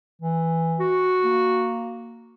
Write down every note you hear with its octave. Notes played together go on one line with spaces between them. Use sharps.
E3
F#4
A#3